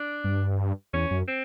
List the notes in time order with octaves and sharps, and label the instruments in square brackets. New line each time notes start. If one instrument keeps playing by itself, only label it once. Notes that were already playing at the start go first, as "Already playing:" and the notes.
Already playing: [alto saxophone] D4
[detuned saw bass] G2
[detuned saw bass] E2 [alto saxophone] C#4
[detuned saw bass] F#2
[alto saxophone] C4